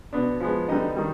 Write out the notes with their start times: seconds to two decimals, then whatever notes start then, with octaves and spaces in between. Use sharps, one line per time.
0.13 B2 B3 D4
0.40 F3 G#3 B3
0.68 D3 G3 B3 D#4 D#5
0.96 D#3 G3